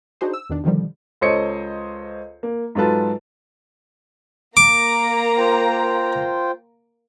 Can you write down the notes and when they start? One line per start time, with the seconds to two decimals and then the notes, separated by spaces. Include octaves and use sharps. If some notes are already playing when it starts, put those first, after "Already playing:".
0.21 D4 D#4 F#4 G#4 C5
0.34 E6
0.50 E2 B2 D#3 D4
0.64 B2 D3 D#3 F3 G3
1.21 C#2 A4 C5 C#5 D#5 C#7
2.43 A#3
2.75 G#2 F#3 F4 A4 B4 A5
4.57 A#3 A#5 D6
5.38 F4 C5 G5